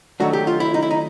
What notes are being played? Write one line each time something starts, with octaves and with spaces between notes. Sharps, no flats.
D#3 F#3 A3 D4 F#4
G4
F4
E4
D#4
E4
D#4